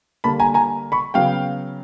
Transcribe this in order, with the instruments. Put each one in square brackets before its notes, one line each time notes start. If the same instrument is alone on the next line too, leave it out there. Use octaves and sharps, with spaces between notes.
[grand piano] D3 G3 A#3 A5 B5
G#5 A#5
G#5 A#5
B5 C#6
C#3 F#3 B3 F5 G5